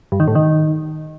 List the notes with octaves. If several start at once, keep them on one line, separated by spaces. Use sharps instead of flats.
G2
D#3
A2
D#3